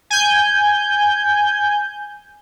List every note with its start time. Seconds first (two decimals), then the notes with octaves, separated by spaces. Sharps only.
0.10 G#5 G6